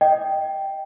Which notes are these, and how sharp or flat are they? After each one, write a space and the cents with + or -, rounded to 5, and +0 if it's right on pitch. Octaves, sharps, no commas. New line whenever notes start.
D#5 +0 G5 +0